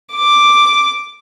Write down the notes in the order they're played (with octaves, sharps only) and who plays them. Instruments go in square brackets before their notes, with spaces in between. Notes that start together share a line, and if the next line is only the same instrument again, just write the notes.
[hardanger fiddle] D6